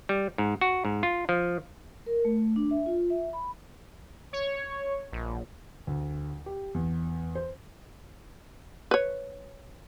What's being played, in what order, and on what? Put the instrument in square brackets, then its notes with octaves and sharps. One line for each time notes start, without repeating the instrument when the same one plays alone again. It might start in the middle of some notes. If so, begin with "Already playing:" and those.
[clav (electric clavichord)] G3
G#2
F#4
G#2
F4
F3
[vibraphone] A#4
A3
D4
E5
F4
E5
B5
[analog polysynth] C#5
A#1
[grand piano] D2
G4
E2
C5
[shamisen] B4 C#5